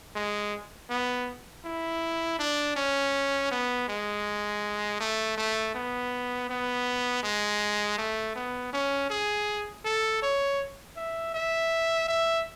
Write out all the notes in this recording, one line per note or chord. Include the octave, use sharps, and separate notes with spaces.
G#3
B3
E4
D4
C#4
B3
G#3
A3
A3
B3
B3
G#3
A3
B3
C#4
G#4
A4
C#5
E5
E5
E5